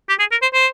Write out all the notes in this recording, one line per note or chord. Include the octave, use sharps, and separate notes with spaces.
G4
G#4
A#4
C5
C5